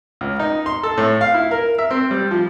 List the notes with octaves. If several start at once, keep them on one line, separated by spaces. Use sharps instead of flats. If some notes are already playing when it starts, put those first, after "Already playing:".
C#2
D#4
C6
A4
A2
F5
E4
A#4
E5
C4
G3
F3